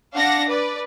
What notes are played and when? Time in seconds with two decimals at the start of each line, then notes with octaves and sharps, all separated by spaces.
0.13 D4 F5 F#5 A#6
0.49 B4 D5